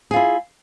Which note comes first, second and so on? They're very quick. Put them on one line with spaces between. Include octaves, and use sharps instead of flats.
G#4 F4 E4